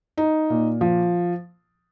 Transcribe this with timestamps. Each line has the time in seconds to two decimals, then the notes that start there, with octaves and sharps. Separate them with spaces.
0.17 D#4
0.50 A#2
0.81 F3